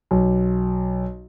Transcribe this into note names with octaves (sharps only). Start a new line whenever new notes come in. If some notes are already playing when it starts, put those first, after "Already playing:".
B1